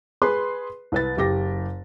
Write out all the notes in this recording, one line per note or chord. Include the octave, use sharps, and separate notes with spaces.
G#4 B4 C6
C2 B4 A6
F#1 G4 A#6